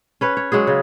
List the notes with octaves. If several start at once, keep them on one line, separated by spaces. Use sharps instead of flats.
C#4 B4 C#5
C#5
F#3 G#3 F#4 G#4
C#3